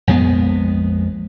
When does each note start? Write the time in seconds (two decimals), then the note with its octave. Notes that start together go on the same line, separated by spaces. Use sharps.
0.07 A#1 F2 G#3 B3